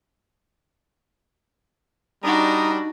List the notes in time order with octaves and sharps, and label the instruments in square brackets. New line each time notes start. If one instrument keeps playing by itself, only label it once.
[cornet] G3 [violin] D4 F#4 [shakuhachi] D#4 [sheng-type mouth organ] A#5 D#6